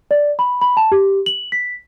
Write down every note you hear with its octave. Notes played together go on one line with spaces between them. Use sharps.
D5
B5
B5
A5
G4
F#7
B6